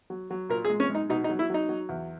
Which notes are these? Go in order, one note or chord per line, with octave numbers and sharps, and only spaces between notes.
F#3
F#3
A#2 A#4
G#4
G#3
C#4
G#3 D#4
B2 D#4
D#4
F#3
E4
F#3 D#4
F#3
E2